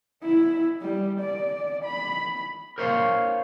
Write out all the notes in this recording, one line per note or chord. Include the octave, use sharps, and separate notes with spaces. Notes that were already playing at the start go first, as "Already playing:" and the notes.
E4
G3
D5
B5
A#4 C5 C#5 E5 F5 C6